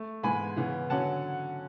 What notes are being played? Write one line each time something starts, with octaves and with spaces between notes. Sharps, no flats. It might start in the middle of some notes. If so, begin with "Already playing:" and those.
Already playing: A3
G#2 E3 G#3 B3 G#5 B5
C#3 E3 B3
D3 F#3 C#4 F#5 A5